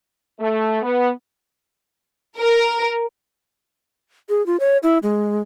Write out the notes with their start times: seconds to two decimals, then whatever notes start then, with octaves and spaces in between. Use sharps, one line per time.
0.40 A3
0.82 B3
2.38 A#4
4.29 G#4
4.46 F4
4.60 C#5
4.83 E4
5.03 G#3